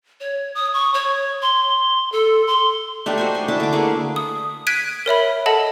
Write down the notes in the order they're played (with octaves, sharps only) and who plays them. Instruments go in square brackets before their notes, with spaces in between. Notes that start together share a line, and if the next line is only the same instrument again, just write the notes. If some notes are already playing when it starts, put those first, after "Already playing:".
[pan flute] C#5
D#6
C#6
C#5
C6
A4
C6
[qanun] A3 D4 D#4 G4
F#4 C5 G#5
D#5
D4 E4 A5 D6
D3 D6
A3 A#3 G#4 B4
[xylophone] D#6
F#6 G#6 B6 D7 D#7
A#4 C#5 E5 B5
A4 D#5 F#5 A5